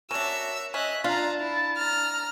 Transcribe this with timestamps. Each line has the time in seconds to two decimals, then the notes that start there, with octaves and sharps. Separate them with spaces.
0.11 C#4 D4 F#4 A#4 C#5 E5 E6
0.74 C#4 D#5 E5 F#6
1.04 D4 F4 F5 A5 A#5
1.40 E4
1.77 A#5 F6